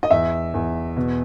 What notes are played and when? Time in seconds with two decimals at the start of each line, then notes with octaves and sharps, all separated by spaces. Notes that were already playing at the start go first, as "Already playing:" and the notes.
0.03 D#5
0.11 E2 E5
0.54 E2
0.97 B2